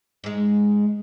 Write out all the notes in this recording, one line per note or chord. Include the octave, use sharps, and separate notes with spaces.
G#2 G#3